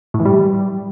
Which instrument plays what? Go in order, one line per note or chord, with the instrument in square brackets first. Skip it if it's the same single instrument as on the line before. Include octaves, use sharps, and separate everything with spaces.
[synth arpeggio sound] A2
E3
G3